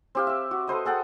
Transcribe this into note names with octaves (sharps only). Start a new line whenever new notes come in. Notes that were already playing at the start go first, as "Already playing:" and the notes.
C4 G4 F5
E5 E6
F#4
A4 B4 C5 D#5
G#4 A4 F#5 G5